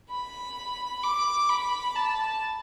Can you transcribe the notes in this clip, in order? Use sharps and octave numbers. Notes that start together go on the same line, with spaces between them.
B5
D6
B5
A5